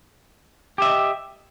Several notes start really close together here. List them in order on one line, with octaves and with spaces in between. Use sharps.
G4 E5 D#5